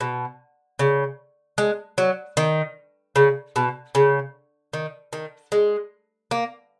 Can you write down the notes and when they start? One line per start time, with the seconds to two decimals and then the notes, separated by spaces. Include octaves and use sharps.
0.01 B2
0.79 C#3
1.58 G#3
1.98 F#3
2.37 D#3
3.16 C#3
3.56 B2
3.95 C#3
4.73 D#3
5.13 D#3
5.52 G#3
6.31 A#3